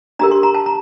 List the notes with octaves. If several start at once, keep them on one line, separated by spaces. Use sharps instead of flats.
D4 G4 A#4 A#5
C6
A#5
A5
A#5